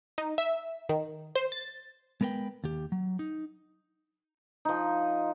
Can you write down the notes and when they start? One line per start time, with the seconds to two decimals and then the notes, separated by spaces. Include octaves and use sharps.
0.18 D#4
0.38 E5
0.89 D#3
1.35 C5
1.52 A6
2.21 G#3 B3 A#4 B4 G5
2.64 D#2 G4
2.92 F#3
3.19 D#4
4.65 F3 D#4